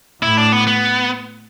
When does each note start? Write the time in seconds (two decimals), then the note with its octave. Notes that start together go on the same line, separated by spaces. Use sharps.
0.22 A2 E4
0.37 D4
0.52 B3
0.67 B3